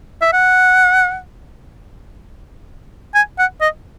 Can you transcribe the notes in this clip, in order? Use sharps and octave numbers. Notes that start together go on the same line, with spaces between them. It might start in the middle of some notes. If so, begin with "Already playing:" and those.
E5
F#5
G#5
F#5
D#5